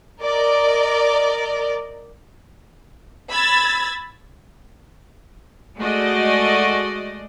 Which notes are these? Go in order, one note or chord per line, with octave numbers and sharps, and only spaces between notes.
A#4 D5 D#5
B5 E6 G#6 A6
G#3 A3 F#4 D5 D#5